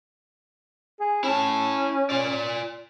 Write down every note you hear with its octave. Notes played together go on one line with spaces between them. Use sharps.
G#4
C#4 E4 A5
F4 D5